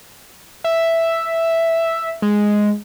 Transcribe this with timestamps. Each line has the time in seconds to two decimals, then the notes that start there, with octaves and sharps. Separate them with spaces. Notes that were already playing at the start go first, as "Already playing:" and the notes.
0.64 E5
2.22 G#3